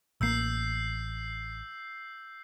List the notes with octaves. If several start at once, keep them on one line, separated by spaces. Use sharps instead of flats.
A1 A#3 E6 G6 C7